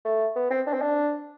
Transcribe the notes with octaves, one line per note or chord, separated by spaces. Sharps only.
A3
B3
C4
D4
C4
D4